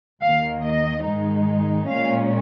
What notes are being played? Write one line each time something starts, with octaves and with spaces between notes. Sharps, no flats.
D#2 D#3 A#3 F5
D#5
G#2 D#3 G#3 D#4
A#2 G#3 C#4 F5